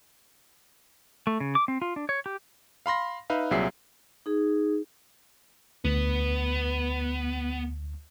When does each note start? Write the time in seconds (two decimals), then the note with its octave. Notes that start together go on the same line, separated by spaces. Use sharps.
1.27 A3
1.40 C#3
1.55 D6
1.68 C4
1.82 F4
1.96 D4
2.09 C#5
2.26 G4
2.86 F5 B5 C6 A#6
3.30 D#4 B4 E5 F5
3.51 C2 A#2 F#3 G#4 E5 C7
4.26 D#4 G#4
5.85 D2 B3